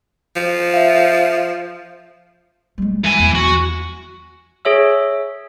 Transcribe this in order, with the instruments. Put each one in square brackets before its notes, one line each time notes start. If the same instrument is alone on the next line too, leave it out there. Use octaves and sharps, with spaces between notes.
[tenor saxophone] F3
[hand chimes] E5 F5
[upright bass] G3 G#3
[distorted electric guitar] E3 G#5
[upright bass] E2
[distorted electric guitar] F#4
[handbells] G#4 C#5 E5 E6